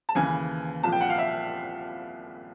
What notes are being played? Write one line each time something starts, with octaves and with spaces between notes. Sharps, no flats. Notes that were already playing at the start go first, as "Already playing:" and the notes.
A5
D#2 C#3 E3 G#5
C2 A#2 F3 A5
G5
F#5
F5
E5